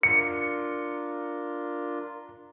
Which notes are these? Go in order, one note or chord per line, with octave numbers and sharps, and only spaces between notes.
D4 F4 A#4 C#7